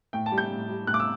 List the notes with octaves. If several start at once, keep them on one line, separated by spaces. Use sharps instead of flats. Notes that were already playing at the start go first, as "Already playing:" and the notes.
A2 G5
A5
G3
G6
A2
G3
A2 F#6
D6
E6